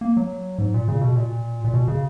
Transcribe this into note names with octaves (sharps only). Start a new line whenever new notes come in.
A#3
F#3
G#2
A#2
C#3
B2
A#2
A#2
B2
C#3